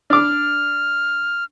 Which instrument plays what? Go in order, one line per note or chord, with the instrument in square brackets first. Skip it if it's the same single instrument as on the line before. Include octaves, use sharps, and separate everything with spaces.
[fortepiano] D4 D6 [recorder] F6